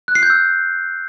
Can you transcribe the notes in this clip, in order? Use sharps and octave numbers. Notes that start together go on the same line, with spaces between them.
F#6
C7
G6
E6